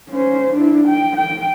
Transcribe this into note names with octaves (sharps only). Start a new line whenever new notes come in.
C#4 C5
D4 E4
G5
G5